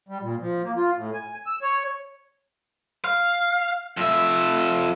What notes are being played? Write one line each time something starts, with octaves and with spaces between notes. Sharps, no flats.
G3
A#2
F3
A#3
F4
A2
G#5
E6
C#5
F5
F2 E5